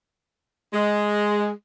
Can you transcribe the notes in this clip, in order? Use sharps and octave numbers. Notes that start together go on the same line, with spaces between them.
G#3